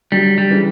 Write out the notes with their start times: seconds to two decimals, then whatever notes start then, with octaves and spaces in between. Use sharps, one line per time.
0.12 D3 F#3 G3
0.38 G3
0.50 C#3 E3